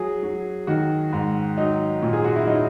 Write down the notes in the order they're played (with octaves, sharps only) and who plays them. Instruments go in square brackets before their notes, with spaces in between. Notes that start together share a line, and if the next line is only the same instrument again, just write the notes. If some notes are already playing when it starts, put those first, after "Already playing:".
Already playing: [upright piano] F#3 G#4
F#3
D#3 F#4
G#2
F#3 D#4
A#2
G#4
F#4
E4
F#3 D#4